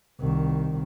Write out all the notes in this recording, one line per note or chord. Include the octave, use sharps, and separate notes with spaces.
C2 D#3